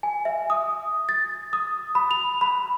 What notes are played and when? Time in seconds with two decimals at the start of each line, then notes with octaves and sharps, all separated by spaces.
0.03 G#5
0.25 E5
0.50 D#6
1.09 A6
1.53 D#6
1.95 B5
2.11 F7
2.41 B5